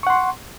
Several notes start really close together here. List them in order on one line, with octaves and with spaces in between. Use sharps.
C#6 F#5 C6